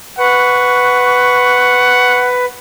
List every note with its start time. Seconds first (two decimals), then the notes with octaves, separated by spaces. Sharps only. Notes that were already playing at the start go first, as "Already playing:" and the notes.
0.19 B4 F#5 C#6